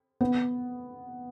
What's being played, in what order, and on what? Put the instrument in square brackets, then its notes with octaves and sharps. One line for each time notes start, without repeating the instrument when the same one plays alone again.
[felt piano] B3